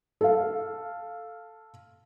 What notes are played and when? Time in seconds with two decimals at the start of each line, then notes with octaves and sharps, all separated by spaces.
0.21 A4 F5